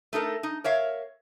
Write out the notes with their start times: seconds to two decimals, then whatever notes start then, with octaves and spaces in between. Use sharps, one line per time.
0.13 A3 D#4 A4 A#4
0.43 D#4
0.64 A#4 C#5 E5 F5